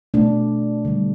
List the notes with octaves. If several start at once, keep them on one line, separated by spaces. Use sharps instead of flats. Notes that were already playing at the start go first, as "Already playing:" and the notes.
B2 A3 D4
D3 G3